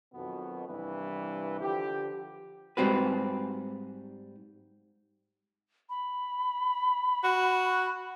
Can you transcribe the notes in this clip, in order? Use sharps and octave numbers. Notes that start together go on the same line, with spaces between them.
B1 F2 B2 D#3 B3
C2 G2 E3 B4
D3 F3 G4
G#2 G3 C4 F#4 B4
B5
F#4